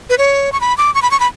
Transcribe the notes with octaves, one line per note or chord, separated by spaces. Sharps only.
B4
C#5
C#6
B5
D6
C#6
B5
C#6
B5